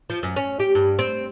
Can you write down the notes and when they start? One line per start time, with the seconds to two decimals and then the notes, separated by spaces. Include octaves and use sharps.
0.10 F3
0.23 F#2
0.36 C#4
0.60 G4
0.75 G2
0.99 C4